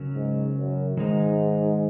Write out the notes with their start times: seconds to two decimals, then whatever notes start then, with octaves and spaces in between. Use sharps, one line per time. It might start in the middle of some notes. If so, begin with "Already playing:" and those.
Already playing: C#3 F#3 C#4 A#4
0.15 G#2
0.56 F#2
0.97 G#2 D#3 G#3 D#4